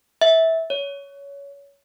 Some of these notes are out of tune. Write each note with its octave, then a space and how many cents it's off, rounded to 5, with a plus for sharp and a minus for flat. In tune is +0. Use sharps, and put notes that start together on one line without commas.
E5 -20
C#5 +20